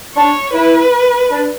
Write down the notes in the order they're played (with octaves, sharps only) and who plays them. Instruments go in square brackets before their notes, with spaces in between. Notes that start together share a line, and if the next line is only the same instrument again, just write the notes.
[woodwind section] D4 [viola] C#5
[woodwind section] E4 [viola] B4
[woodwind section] D4